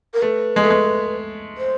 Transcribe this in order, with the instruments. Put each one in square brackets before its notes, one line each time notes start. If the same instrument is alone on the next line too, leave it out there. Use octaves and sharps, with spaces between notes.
[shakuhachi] A#4
[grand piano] A3 [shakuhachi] B4
[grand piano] G#3
A3
G#3
[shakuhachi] C5